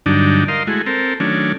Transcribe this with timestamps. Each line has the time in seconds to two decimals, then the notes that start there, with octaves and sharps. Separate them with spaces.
0.06 G2 D3 F#3 D4 D#4
0.48 A#4 D#5 F5 C6
0.67 G#3 A3 E4 F#4
0.86 C4 A4 A#4
1.20 D#3 F#3 A3 C#4 D4